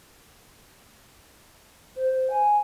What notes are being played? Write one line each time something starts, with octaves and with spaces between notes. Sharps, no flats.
C5
G#5